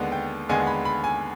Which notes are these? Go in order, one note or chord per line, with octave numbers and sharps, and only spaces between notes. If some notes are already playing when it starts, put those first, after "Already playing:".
Already playing: D#2 D3 G#3 B3
G5
D#2 D3 G#3 B3 G#5
B5
B5
G#5